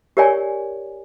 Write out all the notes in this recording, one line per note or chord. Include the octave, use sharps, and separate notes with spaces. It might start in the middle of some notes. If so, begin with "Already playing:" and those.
G4 A#4 C#5 D5 G#5